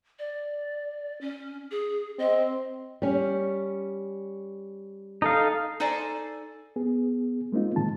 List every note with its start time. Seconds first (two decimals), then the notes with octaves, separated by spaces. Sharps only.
0.19 D5
1.21 C#4
1.71 G#4
2.19 C4 D#5
3.02 G3 C#4
5.22 D#4 A4 F5
5.80 D#4 A4 C5 D5 G#5
6.76 B3 G#4
7.52 G#3 A#3 C4 D#4 F4
7.76 A2 D#3 G#3 A5